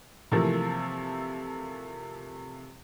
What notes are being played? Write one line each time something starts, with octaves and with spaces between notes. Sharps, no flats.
C3 E3 F3 A3 A#3